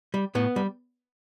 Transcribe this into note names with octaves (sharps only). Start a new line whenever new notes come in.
G3
A2 B3
G3